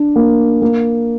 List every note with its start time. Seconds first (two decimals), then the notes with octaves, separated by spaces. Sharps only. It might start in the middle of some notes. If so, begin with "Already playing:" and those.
Already playing: D4
0.16 A#3
0.62 A#3